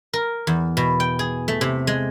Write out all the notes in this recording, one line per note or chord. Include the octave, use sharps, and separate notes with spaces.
A#4
E2
B2
G5
G#4
A3
C3
G#3